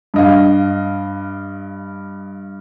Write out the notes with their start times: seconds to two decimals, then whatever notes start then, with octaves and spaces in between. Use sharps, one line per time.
0.14 G2 D#5 F5